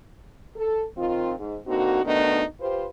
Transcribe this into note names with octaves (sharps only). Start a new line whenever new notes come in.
A4
D#3 C4 F4
G#2
D3 A#3 C4 D#4 F#4
B2 D#3 A3 B3 D4 D#4
F4 G4 B4 C5